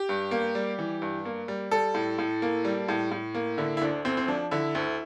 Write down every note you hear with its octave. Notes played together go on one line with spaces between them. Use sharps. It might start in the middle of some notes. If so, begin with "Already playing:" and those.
Already playing: G4
G2
A#3
G3
E3
G2
A#3
G3
G3 A4
A2
A2
A#3
G3
A2
A2
A#3
D3 E4
E4
D2 D4
D2 C4
C4
F3 D4
D3 E4
D2